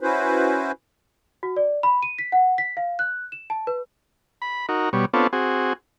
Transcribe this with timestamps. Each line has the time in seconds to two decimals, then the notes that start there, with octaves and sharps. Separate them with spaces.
0.01 C#4 E4 F#4 B4 C5
1.43 F#4
1.57 D5
1.83 B5
2.02 D#7
2.19 B6
2.32 F#5
2.58 B6
2.77 F5
2.99 F#6
3.32 E7
3.50 A5
3.67 B4
4.42 B5
4.69 D#4 F#4 A#4
4.93 B2 G3 C#5
5.14 B3 C4 D4 F4 A4 C#5
5.33 C4 F#4 G#4